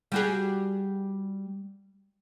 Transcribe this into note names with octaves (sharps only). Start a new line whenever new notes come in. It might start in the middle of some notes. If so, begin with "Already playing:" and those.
G3 F#4 G#4